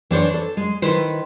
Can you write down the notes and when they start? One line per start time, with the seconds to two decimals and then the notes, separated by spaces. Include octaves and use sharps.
0.11 E3 D4 C5 C#5
0.33 A4
0.57 G#3
0.82 D#3 E4 B4 C5